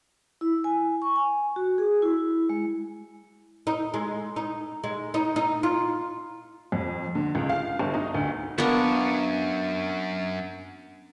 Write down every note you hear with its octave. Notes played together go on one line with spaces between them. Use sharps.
E4
G#5
C#6
G#5
F#4
G#4
E4
G#3
D#4
G#3
D#4
G#3
D#4
D#4
F4
F2
D3
C#2
F5
G1
D#4
D2
F#2 A#3 B3 D4 A#4 C#5